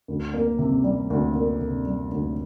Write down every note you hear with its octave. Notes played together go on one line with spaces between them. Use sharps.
D2
A#3
C3
G3
D2
A#3
C3
G3
D2